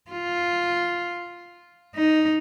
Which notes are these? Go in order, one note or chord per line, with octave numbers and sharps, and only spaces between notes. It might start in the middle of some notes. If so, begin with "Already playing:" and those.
F4
D#4